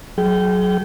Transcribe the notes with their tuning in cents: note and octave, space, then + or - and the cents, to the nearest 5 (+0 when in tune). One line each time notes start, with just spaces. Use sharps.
F#3 +5 G#4 +30 G5 -20